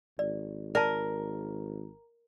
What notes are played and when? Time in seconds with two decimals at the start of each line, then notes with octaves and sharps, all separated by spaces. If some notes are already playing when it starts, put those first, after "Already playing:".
0.19 G#1 D5
0.75 A#4 D5 A5